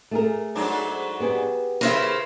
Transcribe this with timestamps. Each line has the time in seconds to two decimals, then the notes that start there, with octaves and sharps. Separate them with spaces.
0.11 A3 G#4 A#4
0.55 G#2 F#3 D4
1.20 B3 G4 G#4
1.81 C#3 E4 A#4 C5 E5